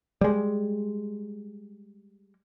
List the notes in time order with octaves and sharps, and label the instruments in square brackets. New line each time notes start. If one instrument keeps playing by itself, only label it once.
[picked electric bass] G3 G#3